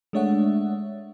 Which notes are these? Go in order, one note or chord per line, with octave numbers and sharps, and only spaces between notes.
G#3 A3 D4 C#5 E5 F#5